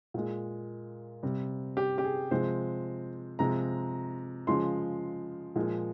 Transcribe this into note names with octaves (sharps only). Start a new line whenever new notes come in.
A#2 G#3
C3 G3
G4
G4
G#4
C3 F3 G#3 C5
C3 F3 G#3 A#5
C#3 F3 G#3 C6
A#2 F3 G#3